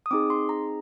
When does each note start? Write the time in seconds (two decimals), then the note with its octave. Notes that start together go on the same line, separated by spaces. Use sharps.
0.06 D#6
0.11 C4 D#4 G#4 D6
0.30 C6
0.49 A#5